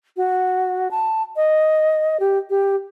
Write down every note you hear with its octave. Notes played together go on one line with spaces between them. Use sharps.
F#4
A5
D#5
G4
G4